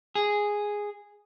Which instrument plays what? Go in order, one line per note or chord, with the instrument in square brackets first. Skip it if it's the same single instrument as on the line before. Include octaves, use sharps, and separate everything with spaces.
[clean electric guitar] G#4